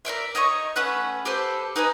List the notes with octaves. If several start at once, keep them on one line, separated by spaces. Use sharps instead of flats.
A#4 C5 D5 E5
D#4 C#5 D#5 C#6
A3 C#4 B4 F#5
G4 A4 B4 C5
D#4 B4 D#5 G#5